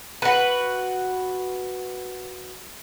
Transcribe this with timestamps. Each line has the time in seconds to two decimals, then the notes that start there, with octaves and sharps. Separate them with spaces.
0.22 F#4 B4